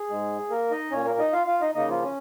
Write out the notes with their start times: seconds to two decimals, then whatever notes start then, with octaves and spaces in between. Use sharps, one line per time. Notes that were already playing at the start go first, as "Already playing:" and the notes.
Already playing: G#4
0.10 G#2 G#3
0.50 A#3 A#4
0.71 D#4 D#5
0.91 A#2 A#3 C#4 C#5
1.05 A#3 A#4
1.19 D#4 D#5
1.33 F4 F5
1.47 F4 F5
1.61 D#4 D#5
1.75 C#3 A#3 D#4 D#5
1.89 F3 F4
2.02 C#4